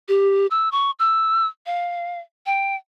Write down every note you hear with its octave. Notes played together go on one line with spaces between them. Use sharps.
G4
E6
C#6
E6
F5
G5